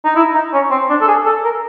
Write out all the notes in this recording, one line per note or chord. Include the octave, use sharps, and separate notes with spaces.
D#4
E4
D#4
C#4
C4
D4
A4
G#4
A4
A#4